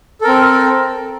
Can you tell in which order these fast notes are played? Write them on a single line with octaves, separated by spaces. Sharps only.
A4 A#4 C4